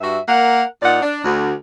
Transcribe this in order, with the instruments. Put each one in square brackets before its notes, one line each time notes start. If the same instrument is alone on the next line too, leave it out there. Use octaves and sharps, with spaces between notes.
[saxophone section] G2 F#4 E5
A#3 A#4 F#5
A#2 D#4 D5 F#5
D4
D2 F#4